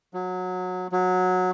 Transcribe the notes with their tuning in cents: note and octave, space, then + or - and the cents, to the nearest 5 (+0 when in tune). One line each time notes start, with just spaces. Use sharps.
F#3 -20
F#3 -15